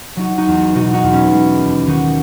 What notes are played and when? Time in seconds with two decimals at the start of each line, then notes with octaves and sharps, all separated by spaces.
0.16 F#3 D#4 F#4
0.38 D#4 F#4
0.48 E2
0.75 B2 D#4 F#4
0.94 D#4 F#4
1.04 E2
1.13 C#4 E4
1.32 G#3
1.60 D#2
1.87 D#3 D#4 F#4